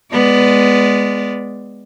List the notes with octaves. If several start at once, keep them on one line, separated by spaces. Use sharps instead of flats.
G#3 B3 D5